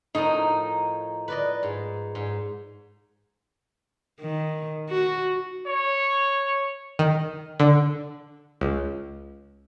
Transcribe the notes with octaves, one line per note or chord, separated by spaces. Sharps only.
A2 F3 D#4 A#4
B4 D5 D#5
G#2
G#2
D#3
F#4
C#5
D#3
D3
C#2